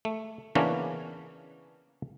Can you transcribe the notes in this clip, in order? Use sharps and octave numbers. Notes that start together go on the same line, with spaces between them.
A3
C#3 E3 A#3 B3 C#4 D4